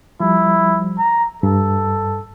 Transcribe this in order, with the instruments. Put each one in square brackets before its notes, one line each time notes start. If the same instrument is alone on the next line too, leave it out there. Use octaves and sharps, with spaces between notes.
[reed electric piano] F3 G3 [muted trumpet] E4
[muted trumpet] A#5
[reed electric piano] G2 [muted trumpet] A4